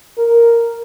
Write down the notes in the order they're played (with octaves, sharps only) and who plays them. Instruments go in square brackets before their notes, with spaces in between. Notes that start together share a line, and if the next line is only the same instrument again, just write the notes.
[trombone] A#4